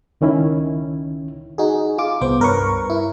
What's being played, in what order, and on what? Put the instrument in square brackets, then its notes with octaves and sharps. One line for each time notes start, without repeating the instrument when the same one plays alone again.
[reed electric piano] C#2 D#3 C#4 E4
[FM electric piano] D#4 F#4 G#4
F4 G#4 D6
C2 B3 C5 D6
G2 A#4 B4 C#5 C#6
E4